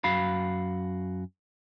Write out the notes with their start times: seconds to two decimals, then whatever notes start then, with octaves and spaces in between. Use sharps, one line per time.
0.04 F#2 F#4 F5 B5